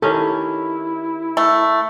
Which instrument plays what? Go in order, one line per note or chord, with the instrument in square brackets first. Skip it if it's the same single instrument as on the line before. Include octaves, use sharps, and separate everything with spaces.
[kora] D#3 C#4 G4 [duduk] E4 [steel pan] A4
[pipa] A3